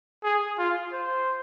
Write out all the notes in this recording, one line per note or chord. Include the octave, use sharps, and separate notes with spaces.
G#4
F4
C5